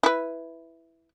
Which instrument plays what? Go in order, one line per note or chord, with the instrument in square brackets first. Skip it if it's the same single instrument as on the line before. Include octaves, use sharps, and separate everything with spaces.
[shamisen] E4 B4